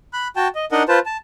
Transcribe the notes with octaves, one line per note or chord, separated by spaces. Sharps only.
B5 F#6
F#4 G5 A5
D#5
D4 D#4 A#4 D#5 F#5
F4 B4 C5 A5
A5